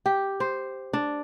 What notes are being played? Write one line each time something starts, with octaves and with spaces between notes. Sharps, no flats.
G4
C5
D4